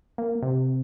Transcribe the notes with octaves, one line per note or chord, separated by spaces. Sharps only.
A#3
C3